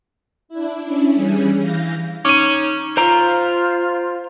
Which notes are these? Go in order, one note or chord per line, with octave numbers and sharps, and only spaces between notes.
D4 E4
C#4 D4 E4
E3 G3 C#4 G#4
E3 F5 G6 A#6
C#4 D#4 D6 D#7
F4 C5 A#5